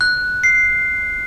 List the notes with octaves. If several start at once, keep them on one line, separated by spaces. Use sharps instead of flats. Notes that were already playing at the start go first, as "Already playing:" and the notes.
F#6
C7